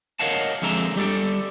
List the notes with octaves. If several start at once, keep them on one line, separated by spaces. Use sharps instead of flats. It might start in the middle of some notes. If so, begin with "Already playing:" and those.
A#4 C#5 D#5 F5 F#5 A5
F2 D3 G#3 E5 A#5
G3 G4 A4 D5